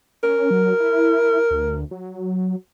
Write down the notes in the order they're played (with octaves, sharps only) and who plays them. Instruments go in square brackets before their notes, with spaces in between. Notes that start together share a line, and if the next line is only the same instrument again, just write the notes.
[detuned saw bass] C#4 [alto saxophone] A#4
[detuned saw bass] F#3
E4
D2
F#3